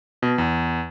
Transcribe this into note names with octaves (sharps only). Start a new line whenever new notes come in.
B2
E2